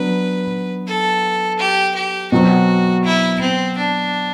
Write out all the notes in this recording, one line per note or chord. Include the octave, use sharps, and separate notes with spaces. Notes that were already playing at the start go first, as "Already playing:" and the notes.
Already playing: F#3 B3 D4 B4
A4
G4
G4
B2 F#3 C4 F#4
E4
C4
D4